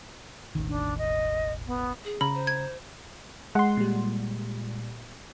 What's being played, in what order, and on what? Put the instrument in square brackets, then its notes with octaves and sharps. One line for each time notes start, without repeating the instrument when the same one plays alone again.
[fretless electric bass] E1 A1 D#3
[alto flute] D4
D#5
B3
[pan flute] G#4
[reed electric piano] C#3 A#5 [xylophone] B5
[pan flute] C5
[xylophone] G#6
[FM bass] G#3 [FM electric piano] F#5 C6
[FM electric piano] A#2 G3